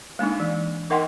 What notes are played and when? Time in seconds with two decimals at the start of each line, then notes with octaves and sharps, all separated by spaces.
0.19 G#3 A#3 D4 D#4
0.40 E3
0.90 D#4 A#4 D#5 F#5 G5 C6